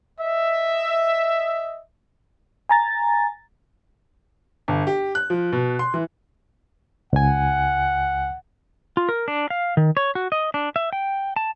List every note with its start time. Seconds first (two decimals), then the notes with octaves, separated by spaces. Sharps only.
0.20 D#5 E5
2.69 G#5 A#5 A6
4.68 G1
4.87 G4
5.15 F#6
5.30 F3
5.52 B2
5.79 C6
5.94 E3
7.13 C#2 F#5 G#5
8.97 F4
9.09 A#4
9.28 D4
9.50 F5
9.77 D#3
9.97 C#5
10.15 F#4
10.32 D#5
10.54 D4
10.76 E5
10.93 G5
11.36 A5